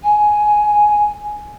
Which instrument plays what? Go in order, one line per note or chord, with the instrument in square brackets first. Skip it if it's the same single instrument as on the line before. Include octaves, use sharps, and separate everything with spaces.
[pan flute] G#5